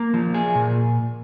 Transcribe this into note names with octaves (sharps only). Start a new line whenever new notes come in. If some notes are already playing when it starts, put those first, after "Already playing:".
Already playing: A#3
F3
G#4
A#2